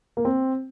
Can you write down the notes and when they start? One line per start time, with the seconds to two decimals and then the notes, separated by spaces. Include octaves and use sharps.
0.17 A#3
0.25 C4